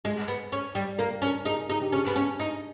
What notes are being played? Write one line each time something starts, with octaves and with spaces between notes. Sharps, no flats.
G#3 G#4
B3
C#4
G3
A#3 A#4
C#4 A#4
D#4 G#4
D#4 G#4
G4
C#4 G#4
B3
C#4
D#4